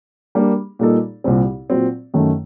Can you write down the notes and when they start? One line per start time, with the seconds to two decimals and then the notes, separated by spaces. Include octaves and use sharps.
0.35 G3 A#3 D4
0.79 A#2 G3 A#3 D#4 A4
1.24 C2 A#2 G3 C4
1.70 A#2 F#3 C4
2.14 F#2 D#3 A3